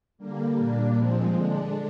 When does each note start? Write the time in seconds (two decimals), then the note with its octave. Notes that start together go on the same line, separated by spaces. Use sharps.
0.18 D3 G3 A#3
0.56 A#2 G3 A#3 D4
0.95 A#2 F3 G#3 C4
1.33 D3 G#3 D4